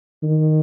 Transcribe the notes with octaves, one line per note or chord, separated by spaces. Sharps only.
D#3